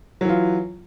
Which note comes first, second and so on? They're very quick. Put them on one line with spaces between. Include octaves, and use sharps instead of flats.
F#3 E3 F4